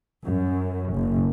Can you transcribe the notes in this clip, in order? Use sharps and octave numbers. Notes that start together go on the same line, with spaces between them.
F#2
F#1